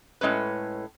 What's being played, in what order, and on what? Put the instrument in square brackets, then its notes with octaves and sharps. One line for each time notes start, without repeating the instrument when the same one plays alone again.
[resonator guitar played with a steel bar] A2 G#3 C#4 B4